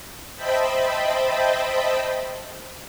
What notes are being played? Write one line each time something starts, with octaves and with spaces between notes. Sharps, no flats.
C5 D#5 E5 G5 A5 B5